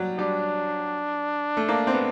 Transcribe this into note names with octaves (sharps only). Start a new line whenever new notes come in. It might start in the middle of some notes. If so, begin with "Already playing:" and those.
Already playing: F#3 G3
G3 D4
A3
A#3
C4
B3